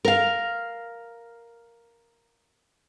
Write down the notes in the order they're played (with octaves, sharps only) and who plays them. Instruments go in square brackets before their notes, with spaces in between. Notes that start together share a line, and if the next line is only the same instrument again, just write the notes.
[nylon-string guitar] A#4 F5